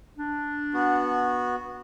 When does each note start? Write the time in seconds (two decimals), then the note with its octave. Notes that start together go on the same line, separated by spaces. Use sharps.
0.18 D4
0.74 B3 F#4